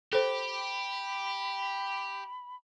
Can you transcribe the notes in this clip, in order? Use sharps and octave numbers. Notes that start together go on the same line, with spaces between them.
G4 A4 C5 B5